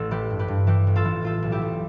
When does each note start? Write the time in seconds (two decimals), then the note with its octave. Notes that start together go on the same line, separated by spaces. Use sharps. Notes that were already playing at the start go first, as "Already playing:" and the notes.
Already playing: A1 A4
0.11 E3 G4 B4
0.30 G2
0.39 G4 B4
0.48 G2
0.67 E3 G4 B4
0.87 A1
0.96 F4 A4
1.05 E3
1.22 A2 F4 A4
1.42 B1
1.52 E4 G4
1.62 B1